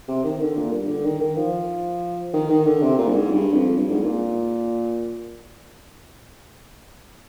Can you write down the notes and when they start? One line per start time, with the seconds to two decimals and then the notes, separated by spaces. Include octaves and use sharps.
0.08 C3
0.24 D#3
0.41 D3
0.57 A#2
0.73 G2
0.88 D3
1.04 D#3
1.20 D#3
1.37 F3
2.34 D#3
2.50 D#3
2.66 D3
2.82 C3
2.98 A#2
3.08 G2
3.14 G#2
3.30 G2
3.54 F2
3.78 G2
3.91 G#2
4.03 A#2